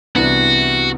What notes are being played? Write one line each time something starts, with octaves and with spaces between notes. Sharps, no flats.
C2 C3 E3 B3 D4 F#4